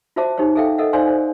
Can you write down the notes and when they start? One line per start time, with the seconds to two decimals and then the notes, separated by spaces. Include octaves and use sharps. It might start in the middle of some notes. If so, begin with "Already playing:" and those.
0.16 F4 F#4 C5 E5 A5 D6
0.37 D#4 G4 C5 C#5
0.55 G#4 A4 E5 F5 G5
0.78 A4 A#4 D#5 E5 F#5
0.93 D#4 C5 D5 F5 G#5 C6
1.09 C5